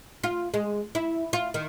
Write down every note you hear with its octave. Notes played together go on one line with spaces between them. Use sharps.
F4
G#3
E4
F4
D#3